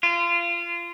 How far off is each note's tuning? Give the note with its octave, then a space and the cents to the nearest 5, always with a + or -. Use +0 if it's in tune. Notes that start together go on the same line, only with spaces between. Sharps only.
F4 -25